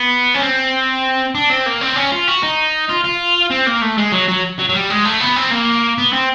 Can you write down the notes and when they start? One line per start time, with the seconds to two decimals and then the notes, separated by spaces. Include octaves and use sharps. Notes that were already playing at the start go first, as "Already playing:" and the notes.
Already playing: B3
0.34 C#4
0.42 C4
1.35 D4
1.50 C4
1.66 A#3
1.81 C4
1.96 C#4
2.12 F4
2.27 F#4
2.43 D#4
2.89 F4
3.04 F4
3.50 C4
3.66 A#3
3.81 A3
3.97 G#3
4.12 F#3
4.29 F#3
4.59 F#3
4.69 F#3
4.74 G3
4.90 G#3
5.05 A3
5.21 B3
5.37 C4
5.51 A#3
5.98 B3
6.13 C4